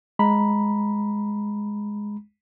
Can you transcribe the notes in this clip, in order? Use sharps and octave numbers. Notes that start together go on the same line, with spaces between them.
G#3 A#5 B5